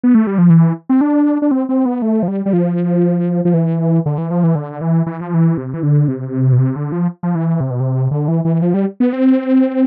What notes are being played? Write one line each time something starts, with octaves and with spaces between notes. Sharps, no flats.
B3
A3
G3
F3
E3
C4
D4
D4
C4
C4
B3
A3
F3
G3
G3
F3
F3
E3
D3
E3
F3
E3
D3
E3
E3
F3
E3
C3
E3
D3
C3
B2
C3
D3
F3
F3
E3
C3
B2
C3
D3
E3
E3
F3
G3
B3
C4